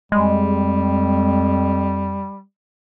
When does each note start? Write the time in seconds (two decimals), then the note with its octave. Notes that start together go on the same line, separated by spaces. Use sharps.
0.12 F2 G3 G#3